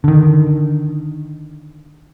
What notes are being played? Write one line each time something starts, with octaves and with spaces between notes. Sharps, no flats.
D3 D#3